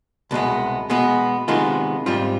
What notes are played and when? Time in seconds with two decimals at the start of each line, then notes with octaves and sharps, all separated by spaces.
0.31 C2 B2 G#3 B3
0.90 B2 G#3 B3
1.48 C3 D#3 G#3 B3 F4
2.06 G#2 G3 C4 F4